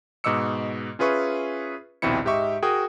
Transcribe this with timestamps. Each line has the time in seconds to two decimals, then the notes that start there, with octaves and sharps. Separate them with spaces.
0.24 G#2 B2 D#5 D6 E6 C#7
0.99 C#4 F4 G#4 B4 E5 C#6
2.02 A#1 D#2 B2 C4 E4 C#7
2.25 G#2 G4 D#5 E5 C#6
2.62 F#4 G#4 A#4 G5 D#6